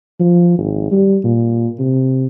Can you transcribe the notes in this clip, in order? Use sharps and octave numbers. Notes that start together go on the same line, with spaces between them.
F3
G#1
G3
A#2
C3